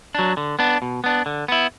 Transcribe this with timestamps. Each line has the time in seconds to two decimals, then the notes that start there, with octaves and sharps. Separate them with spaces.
0.15 F#3 D4
0.37 D3
0.59 B3 D4
0.82 B2
1.04 B3 D4
1.26 D3
1.48 B3 E4